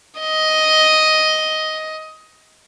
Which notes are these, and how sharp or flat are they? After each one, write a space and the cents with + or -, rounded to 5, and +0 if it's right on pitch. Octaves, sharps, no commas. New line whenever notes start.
D#5 +5